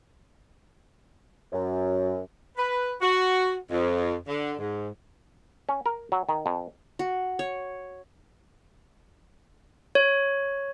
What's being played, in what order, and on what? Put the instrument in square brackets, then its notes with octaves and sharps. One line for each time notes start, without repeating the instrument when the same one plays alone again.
[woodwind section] F#2
[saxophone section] B4
F#4
F2
D3
G#2
[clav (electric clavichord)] C#4
A#4
F#3
D#3
F2
[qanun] F#4
C#5
[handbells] C#5